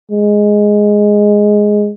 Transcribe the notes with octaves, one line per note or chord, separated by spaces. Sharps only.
G#3